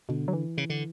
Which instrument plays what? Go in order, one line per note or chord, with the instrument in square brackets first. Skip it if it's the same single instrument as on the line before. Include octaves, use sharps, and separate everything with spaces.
[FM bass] B2 [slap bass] D3
[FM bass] F#3
E3
[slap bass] C#3
D3